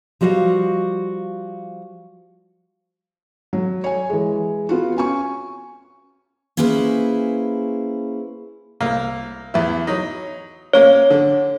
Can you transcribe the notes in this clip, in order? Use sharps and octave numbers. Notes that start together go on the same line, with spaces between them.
F3 G3 F#4 D#5 F5
F#3
C#5 G#5
E3 G#3
B3 F4 F#4
C#4 G#5 C#6
A#3 C#4 E4 G#4 B4 C5
C2 A#3
E2 E4
F#3 D#4
A#3 C#4 C#5
D3